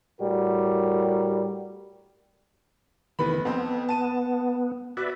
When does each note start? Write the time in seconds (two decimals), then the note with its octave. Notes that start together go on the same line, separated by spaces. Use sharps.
0.20 A2 G3 F#4 A#4
3.19 F1 D#3 E3 B3 B5
3.45 F2 B3 C4
3.89 A5 D#7
4.97 F#4 B4 D5 E5